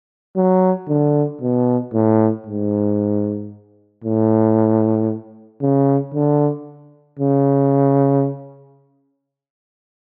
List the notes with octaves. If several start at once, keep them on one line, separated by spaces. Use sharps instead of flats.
F#3
D3
B2
A2
G#2
A2
C#3
D3
C#3